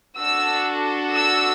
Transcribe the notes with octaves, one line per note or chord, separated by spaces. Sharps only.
D4 F#4 A4 E6
E6